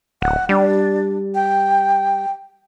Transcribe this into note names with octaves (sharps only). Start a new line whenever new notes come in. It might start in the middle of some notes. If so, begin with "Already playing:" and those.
D1 F#5
G3 D4
G5